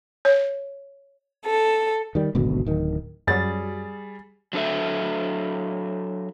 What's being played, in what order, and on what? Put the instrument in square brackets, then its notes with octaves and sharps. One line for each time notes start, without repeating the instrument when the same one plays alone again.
[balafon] C#5
[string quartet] A4
[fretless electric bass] D#3 G3
D1 G#1 D2 B2
D1 D#3
[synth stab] F#2 F#3 [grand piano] G3 G#4 A6
[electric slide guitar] F#3 D4 A4 E5